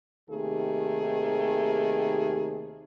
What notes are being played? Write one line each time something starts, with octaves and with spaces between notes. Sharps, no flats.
D#2 C3 D#3 A3 G4 G#4